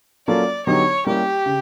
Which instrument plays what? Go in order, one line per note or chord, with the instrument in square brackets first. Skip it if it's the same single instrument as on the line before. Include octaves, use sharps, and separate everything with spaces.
[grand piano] F#3 A#3 C#4 F4 A4 [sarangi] D5
[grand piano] D3 F#3 B3 D#4 G4 [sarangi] C#5
[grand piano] G3 A#3 C#4 E4 [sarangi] G4
[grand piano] C#3